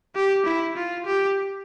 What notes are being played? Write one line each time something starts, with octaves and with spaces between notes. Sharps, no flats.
G4
E4
F4
G4